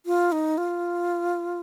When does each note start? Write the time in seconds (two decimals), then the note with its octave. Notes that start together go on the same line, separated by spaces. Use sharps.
0.06 F4
0.32 D#4
0.58 F4